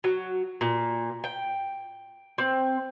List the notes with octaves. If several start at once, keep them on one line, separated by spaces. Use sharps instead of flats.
F#3
A#2
G5
C4